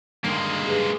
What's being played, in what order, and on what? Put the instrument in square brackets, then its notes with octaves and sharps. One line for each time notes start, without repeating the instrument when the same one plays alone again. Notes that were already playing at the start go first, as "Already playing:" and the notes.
[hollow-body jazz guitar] G2 D3 D#3 [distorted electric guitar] G#3 A#3
[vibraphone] G4 G#4 B4